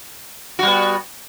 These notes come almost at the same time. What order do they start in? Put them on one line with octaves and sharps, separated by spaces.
F#4 G3 B3